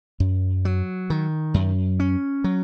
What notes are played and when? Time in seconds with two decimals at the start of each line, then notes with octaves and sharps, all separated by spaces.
0.20 F#2
0.65 F#3
1.10 D#3
1.54 F#2
2.00 C#4
2.44 F#3